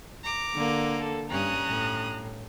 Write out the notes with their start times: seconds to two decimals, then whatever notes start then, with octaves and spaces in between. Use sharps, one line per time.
0.24 A#5 D6
0.54 D3 A#3
1.00 A4
1.30 G2 C#4 A#5 D#6 F#6
1.68 A2